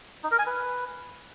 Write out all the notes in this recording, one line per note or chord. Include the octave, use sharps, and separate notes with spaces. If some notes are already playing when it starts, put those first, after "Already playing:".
D#4
A#4
G#5
B4